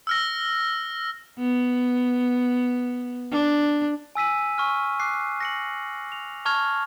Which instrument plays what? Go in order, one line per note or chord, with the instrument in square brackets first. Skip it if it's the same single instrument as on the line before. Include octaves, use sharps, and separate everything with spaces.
[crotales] E6 F6 A#6
[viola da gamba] B3
D4
[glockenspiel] G#5 E6 B6 D#7
G#5 C#6 F6
D6 F#6 C7
A#6 C#7 F#7
F7
A5 C#6 F6 G#6 F7